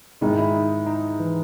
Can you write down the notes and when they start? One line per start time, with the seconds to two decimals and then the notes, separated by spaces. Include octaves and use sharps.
0.21 G#2 D#3 G#3 E4
0.38 E4
0.54 D#4
0.86 D#4
1.20 E3